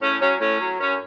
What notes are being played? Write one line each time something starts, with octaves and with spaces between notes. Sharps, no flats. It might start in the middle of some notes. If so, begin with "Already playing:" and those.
A2 C#4
F#3 C#4
A2 C#4
F#3
F#2 C#4